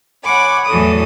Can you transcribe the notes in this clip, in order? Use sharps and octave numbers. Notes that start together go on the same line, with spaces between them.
C#5 F#5 G#5 B5 D6
E2 A2 E3 F#3 A4 D#6